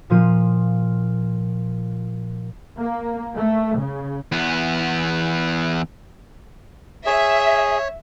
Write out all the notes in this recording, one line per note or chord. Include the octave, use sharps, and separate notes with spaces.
A#2 F3 F4 D#7
A#3
A3
C#3
E2 B3
G#4 C#5 E5